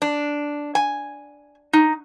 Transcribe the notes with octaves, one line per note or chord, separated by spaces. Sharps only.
D4
G#5
D#4